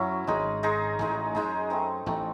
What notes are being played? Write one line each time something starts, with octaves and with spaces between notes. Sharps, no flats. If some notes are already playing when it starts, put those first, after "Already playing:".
Already playing: F#2 F#3 C#4 E4
G#1 G#2 G#3 D#4 G#4
G#3 D#4 G#4
A1 A2 G#3 D#4 G#4
F#2 G#3 D#4 G#4
A3 C4 D#4
A1 A2 A3 C4 D#4